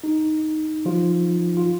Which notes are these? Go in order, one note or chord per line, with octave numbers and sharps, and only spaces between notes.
D#4
F3 F4
F4